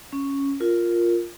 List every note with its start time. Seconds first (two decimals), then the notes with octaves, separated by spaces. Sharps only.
0.13 C#4
0.60 F4 A#4